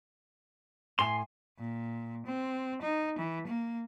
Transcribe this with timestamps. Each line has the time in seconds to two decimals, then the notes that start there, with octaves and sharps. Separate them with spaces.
0.99 A2 G#5 C6
1.59 A#2
2.26 C4
2.82 D#4
3.18 E3
3.47 A#3